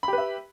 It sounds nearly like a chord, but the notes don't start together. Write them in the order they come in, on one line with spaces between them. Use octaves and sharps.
B5 G4 B4 E5